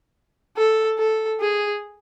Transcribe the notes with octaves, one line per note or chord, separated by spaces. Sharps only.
A4
A4
G#4